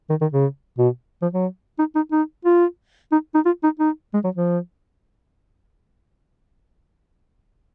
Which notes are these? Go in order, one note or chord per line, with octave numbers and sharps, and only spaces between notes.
D#3
D#3
C#3
B2
F3
F#3
D#4
D#4
D#4
F4
D#4
D#4
F4
D#4
D#4
G#3
F#3
F3